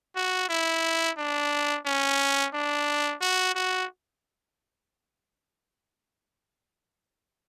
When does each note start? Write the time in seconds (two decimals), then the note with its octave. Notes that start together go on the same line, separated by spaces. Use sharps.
0.16 F#4
0.49 E4
1.17 D4
1.86 C#4
2.54 D4
3.21 F#4
3.55 F#4